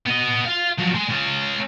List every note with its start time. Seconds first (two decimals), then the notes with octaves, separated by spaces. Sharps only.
0.06 B3 D#5
0.45 F4 F5
0.79 F3 F#3
0.95 G#3
1.10 G#3 C#4